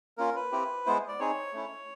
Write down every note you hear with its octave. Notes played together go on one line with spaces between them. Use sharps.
A#3 C#4 F4 A#4
B4
C4 E4 G4
G#3 B3 E4 C5
D5
C4 D#4 G#4 C#5
A3 C#4 E4